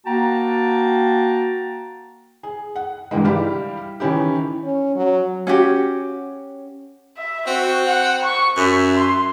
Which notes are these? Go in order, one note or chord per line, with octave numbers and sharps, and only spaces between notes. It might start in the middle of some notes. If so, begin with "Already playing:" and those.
A#3 F#4 G5 A5 A#5
G#4
F#5
G2 D#3 E3 G#3
G3 E4 G4 F5
D#3 E3 C#4 E4 G4
C#4
F#3
C#4 F#4 G4
E5
C4 F#4
F#5
C#6
F#2 E5
C6